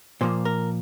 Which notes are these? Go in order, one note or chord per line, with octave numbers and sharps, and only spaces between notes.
A#2 F3 A#3 C5
A#4